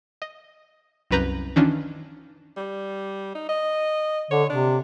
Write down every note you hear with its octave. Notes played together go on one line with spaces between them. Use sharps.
D#5
C2 F#2 B4 A#5 G6
D#3 E3 C#4 D4 F4
G3
D#4
D#5
D3 C#5
C3 D4